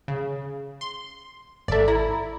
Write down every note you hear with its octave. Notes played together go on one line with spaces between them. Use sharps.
C#3
C6
G#1 A4 D5 E5
E4 A#5